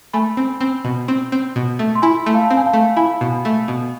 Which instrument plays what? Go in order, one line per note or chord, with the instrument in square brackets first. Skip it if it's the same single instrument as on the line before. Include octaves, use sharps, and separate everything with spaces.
[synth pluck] A3 [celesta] G#5 B5
[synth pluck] C4
C4
B2
C4
C4
B2
A3
[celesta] C6
[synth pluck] E4 [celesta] G#5 B5
[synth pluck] A3
[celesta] F5 A5
[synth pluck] C4
[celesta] G#5
F5 A5
[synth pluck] A3
[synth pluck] E4 [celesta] G#5 B5
[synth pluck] B2
A3
B2